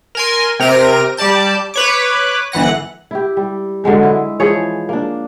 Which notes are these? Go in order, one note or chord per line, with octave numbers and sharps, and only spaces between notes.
A#4 G#5 C6
C3 C4 A#4 A#6 D7 D#7
G3 G4 D5 A5 G6
B4 C#5 D6
G1 E3 F#5 A#6
E4 G4
G3
D3 F#3 G#3 D#4
E4
E3 F3 G#4 C#5
A#3 D4